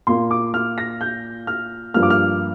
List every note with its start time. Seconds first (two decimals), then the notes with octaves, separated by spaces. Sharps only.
0.07 A#2 A#3 C6
0.31 D6
0.54 F6
0.78 A#6
1.01 G6
1.47 F6
1.94 G2 F3 A#3 F6
2.03 D6
2.10 F6